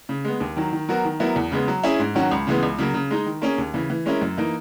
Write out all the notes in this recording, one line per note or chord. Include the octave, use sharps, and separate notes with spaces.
C#3
G#3 B3
D#2
D#3 F#3
D#3
F#3 B3 F#4 A#4
D#3
F#3 B3 E4 A#4
E2
C#3 G#3 B3
F#3
C#4 E4 G#4
G#2
D#3 F#3 C#4 F#4
C#2
C#3 E3 G#3 B3
C#2
C#3 F#3 A#3
C#3
G#3 D#4
D#3
A#3 C#4 G#4
D#2
C#3 E3
E3
G#3 C#4 E4 A#4
F#2
E3 A#3 D#4